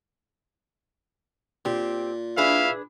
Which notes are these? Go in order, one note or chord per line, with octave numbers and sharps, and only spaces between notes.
A#2 C4 G4
D4 E4 G#4 B4 E5 F5